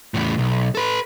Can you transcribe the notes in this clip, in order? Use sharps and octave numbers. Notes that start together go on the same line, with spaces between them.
E2 A2
B1
A4 B4